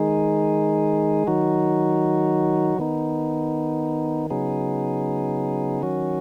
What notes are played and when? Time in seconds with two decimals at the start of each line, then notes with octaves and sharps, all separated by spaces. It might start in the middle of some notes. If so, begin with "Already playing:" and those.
Already playing: D#3 G#3 D#4 G#4
1.27 D#3 F#3 D#4 F#4
2.79 D#3 B3 D#4
4.30 C#3 F#3 B3 D#4 G#4
5.82 D#3 F#3 C#4 F#4